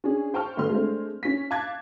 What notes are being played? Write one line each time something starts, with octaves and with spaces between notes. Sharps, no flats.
C#4 D4 G#4
C5 G5 A5 C#6 F6
G1 A3 B3 C6 F6
G#3 A3 C4 D4 C5
C#4 B6
F5 A5 D6 F#6 G#6 A6